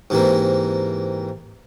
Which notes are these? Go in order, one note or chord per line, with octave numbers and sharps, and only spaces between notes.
G#2 C3 E3 A#3